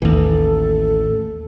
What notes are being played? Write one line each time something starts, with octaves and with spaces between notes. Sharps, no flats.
A1 D#2 E3 A4